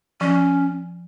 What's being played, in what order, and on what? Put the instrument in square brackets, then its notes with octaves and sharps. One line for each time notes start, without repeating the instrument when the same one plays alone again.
[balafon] F3 [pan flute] C#4